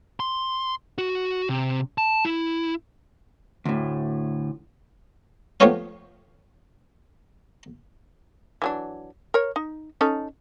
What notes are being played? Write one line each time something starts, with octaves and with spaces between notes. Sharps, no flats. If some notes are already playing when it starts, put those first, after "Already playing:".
C6
F#4
C3
A5
E4
D2 A2
F3 A3 B3 G4 C#5 F5
E3 F#3 D4
A#4 C#5
D#4
C#4 D#4 A4